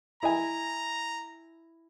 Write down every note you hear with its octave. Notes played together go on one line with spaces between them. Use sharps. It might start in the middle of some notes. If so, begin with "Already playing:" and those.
E4 D#5 G#5 A#5